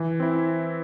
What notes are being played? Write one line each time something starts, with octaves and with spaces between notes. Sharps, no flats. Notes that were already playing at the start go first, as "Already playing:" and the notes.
Already playing: E3
C4 E4